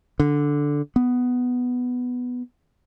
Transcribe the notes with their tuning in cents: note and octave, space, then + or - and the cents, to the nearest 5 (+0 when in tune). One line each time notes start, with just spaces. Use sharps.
D3 -5
B3 +5